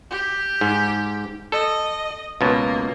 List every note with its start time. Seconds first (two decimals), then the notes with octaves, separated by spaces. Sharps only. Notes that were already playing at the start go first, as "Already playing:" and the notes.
0.10 G4
0.61 G#2
1.52 A4 D#5
2.41 C#2 B2 A#3